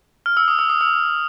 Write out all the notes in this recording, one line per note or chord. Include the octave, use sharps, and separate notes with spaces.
F6
E6
D#6
E6
D#6
E6